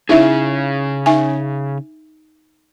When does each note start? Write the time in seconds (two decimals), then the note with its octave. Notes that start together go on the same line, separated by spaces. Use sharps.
0.09 C#3 C#4 D#4 E4 G#4 E5
1.06 D#4 E5 G#5